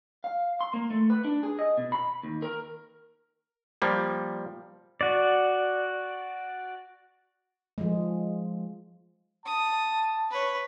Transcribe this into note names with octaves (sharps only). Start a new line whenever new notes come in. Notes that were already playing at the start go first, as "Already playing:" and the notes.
F5
C6
A#3
A3
B4
D4
G#4
D#5
B2
B5
D#2
A#4
F3 G3 A#3
F#4 D5
F3 G#3
A5 D#6
B4 C#5